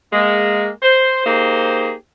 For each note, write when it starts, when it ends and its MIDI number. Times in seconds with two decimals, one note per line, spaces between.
0.13 0.68 56
0.13 0.68 58
0.82 1.21 72
1.24 1.92 58
1.24 1.92 63
1.24 1.92 67
1.24 1.92 68
1.24 1.92 72